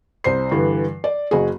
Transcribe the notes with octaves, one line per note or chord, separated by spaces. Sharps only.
C2 C5 C7
G2 D3 E3
D5
F#1 F#4 G#4